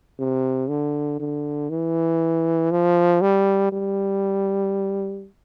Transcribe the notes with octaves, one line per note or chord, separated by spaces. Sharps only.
C3
D3
D3
E3
F3
G3
G3